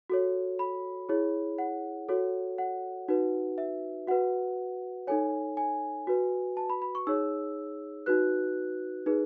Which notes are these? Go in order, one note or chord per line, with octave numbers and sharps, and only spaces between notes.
F#4 A4 C#5
B5
E4 G#4 C#5
F#5
F#4 A4 C#5
F#5
D#4 F#4 B4
E5
F#4 B4 F#5
D#4 A4 C#5 G#5
G#5
F#4 B4
A5
B5
B5
C#6
D#4 G#4 C#5 E6
D#4 F#4 B4 F#6
D#4 G#4 B4